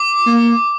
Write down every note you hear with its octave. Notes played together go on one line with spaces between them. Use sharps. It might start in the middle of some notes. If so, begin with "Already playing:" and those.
Already playing: D6
A#3